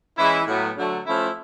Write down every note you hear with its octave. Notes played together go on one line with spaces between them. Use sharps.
E3 G#3 C#4 E4
A2 F#3 B3
D3 F#3 A3
F3 A3 C#4 E4